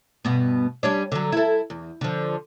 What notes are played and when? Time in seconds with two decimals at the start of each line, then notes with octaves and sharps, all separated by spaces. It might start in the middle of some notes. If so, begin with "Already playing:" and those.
0.25 G2 B2 B3
0.83 G3 C#4 D4
1.12 D3 F#3
1.32 E4 A4
1.70 E2
2.01 D3 F3